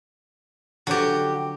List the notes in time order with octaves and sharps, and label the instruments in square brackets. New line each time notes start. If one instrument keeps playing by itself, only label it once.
[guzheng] D3 F3 F#3 [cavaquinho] F#4 G4